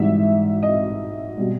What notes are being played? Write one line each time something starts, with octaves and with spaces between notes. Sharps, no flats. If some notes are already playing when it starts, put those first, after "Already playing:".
Already playing: G#2 E3 G3 E5
D#5
B2 G3